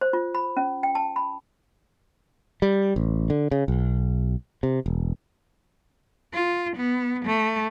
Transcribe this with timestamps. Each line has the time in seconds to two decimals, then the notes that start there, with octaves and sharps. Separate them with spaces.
0.01 C5
0.13 F4
0.35 B5
0.57 C#4
0.83 G5
0.95 A5
1.16 B5
2.62 G3
2.96 A1
3.30 D3
3.51 C#3
3.68 B1
4.63 C3
4.86 E1
6.34 F4
6.77 B3
7.25 A3